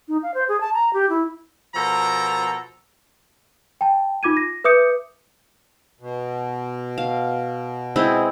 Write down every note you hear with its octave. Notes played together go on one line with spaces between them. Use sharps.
D#4
F5
C5
G#4
A5
A#5
G4
E4
B2 F3 A4 A#4 A#5
G5 A5
D#4 F4 D6 G#6 D#7
A#6
B4 E5 D6 D#6 G6 C#7
B2
F5
G#3 C4 E4